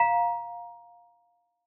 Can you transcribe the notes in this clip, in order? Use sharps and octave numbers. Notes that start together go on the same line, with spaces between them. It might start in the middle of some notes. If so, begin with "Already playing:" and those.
Already playing: F5 A#5